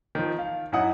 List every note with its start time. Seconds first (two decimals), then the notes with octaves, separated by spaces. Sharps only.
0.15 D#3 F3
0.38 F5
0.72 F#2 D#4 E4 F#5 D#6